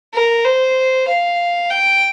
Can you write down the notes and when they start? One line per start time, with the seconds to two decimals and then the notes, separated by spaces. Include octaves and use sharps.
0.14 A#4
0.45 C5
1.08 F5
1.71 G5